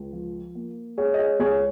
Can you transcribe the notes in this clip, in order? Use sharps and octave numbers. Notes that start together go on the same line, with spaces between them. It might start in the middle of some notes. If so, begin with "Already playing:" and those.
Already playing: C#2
F3
A#3
G#3 G#4 C#5
D#5
G#4 C#5
C#2 G#4 C#5